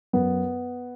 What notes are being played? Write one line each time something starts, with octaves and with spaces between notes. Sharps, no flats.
F#2 B3